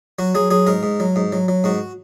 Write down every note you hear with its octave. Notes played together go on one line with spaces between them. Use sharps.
F#3 F#4
F#3 G#4
F#3 G#4
G#2 A#4
G#2
F#3
G#2
F#3
F#3
G#2 F#4